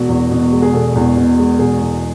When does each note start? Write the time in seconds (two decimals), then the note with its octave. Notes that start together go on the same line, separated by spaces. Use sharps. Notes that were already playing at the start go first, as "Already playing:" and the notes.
Already playing: E1 F#4
0.09 E2
0.31 B2
0.52 G#3
0.62 G#4
0.74 E1 A4
0.95 E2
1.16 B2
1.38 G#3
1.59 E1 G#4
1.81 E2